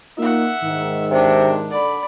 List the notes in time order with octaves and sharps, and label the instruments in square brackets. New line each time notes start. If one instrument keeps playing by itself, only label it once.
[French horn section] A#3 D#4 F4 [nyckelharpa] E5 F#5
[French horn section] G#2 D#3
[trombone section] C3 [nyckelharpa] D4
[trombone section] D3 [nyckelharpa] D5 B5